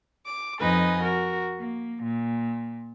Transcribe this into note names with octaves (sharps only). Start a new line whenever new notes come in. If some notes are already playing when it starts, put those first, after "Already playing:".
D6
F2 D#4 B4 D#5 G#5
F#4 A#4
A#3
A#2